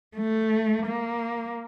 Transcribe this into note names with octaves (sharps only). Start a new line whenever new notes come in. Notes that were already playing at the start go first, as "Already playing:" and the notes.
A3
A#3